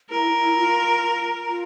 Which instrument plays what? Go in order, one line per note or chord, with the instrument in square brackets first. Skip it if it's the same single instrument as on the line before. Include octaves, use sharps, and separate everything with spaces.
[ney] E4 [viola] A#4
[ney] E4
F4
F4